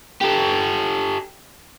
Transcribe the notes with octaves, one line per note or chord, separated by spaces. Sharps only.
G4 A4